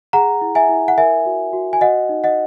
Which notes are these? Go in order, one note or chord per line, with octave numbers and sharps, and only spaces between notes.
G#4 F#5 A#5
E4
E5 G#5
E4
F#5
A#4 E5 G#5
F#4
F#4
G#5
F#4 D#5 F#5
D#4
D#5 F#5